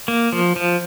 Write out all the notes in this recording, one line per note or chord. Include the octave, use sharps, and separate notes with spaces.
A#3
F3
F3